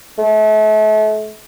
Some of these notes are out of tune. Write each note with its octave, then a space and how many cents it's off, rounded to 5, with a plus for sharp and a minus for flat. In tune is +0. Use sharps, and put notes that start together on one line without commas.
A3 -35